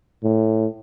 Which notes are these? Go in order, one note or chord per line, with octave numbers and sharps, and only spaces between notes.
A2